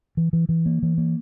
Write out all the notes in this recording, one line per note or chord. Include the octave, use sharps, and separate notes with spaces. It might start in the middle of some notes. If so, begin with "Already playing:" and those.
E3
E3
E3
A#3
E3
A#3